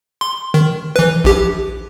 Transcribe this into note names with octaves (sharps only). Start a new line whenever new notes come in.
C6
D#3
E3 B4
A#1 G4